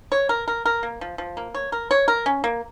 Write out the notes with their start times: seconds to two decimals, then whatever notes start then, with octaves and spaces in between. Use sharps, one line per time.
0.12 C#5
0.29 A#4
0.48 A#4
0.65 A#4
0.83 A#3
1.01 F3
1.18 F3
1.37 A#3
1.54 C#5
1.72 A#4
1.91 C#5
2.08 A#4
2.26 C#4
2.44 A#3